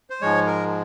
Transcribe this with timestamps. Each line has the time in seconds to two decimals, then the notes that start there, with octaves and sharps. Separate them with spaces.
0.10 C5
0.21 G#2 F3 G#3 C#5
0.46 A#4